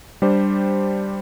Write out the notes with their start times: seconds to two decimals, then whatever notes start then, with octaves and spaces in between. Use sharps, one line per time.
0.22 G3 D4 G4 C5